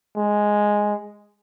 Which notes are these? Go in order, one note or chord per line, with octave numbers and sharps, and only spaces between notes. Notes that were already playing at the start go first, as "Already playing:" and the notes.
G#3